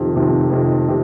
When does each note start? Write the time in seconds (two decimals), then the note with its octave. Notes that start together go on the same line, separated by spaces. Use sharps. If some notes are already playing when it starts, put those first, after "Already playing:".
Already playing: F2 C3 D#3
0.16 F2 C3 D#3
0.50 F2 C3 D#3
0.89 C3